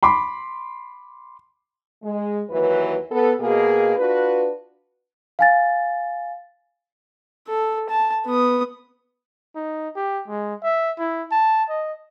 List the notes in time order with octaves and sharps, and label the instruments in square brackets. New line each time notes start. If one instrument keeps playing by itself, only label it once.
[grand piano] B5 C6 D6
[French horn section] G#3
D#2 E3 F#3 B4
B3 A4
B2 A#3 G#4
D4 F4 F#4 B4
[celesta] F5 G#5 A6
[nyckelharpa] A4
A5
B3 D#6
[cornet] D#4
G4
G#3
E5
E4
A5
D#5